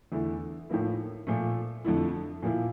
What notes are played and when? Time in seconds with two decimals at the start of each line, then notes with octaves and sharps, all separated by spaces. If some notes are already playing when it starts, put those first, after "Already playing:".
0.12 E2 D3 A3 E4
0.70 A2 F3 A#3 E4
1.27 A#2 F3 A3
1.85 F2 D3 A3 E4
2.42 A#2 F3 A#3 E4